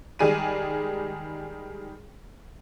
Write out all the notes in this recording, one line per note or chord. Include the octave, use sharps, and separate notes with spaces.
D#3 G3 G#3 G#4 D5 D#7